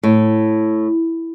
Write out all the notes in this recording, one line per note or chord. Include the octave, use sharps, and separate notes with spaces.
A2